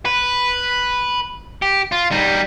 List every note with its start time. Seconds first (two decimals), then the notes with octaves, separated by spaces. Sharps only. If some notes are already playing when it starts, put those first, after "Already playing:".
0.05 B4
1.62 G4
1.92 F4
2.12 G3 D#4